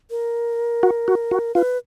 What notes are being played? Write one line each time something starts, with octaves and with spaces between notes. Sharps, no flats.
A#4
F#4
F#4
F#4
F4 B4